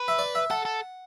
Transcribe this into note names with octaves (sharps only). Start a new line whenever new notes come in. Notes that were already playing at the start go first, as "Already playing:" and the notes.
Already playing: B4
E5
D5
E5
A4 F#5
A4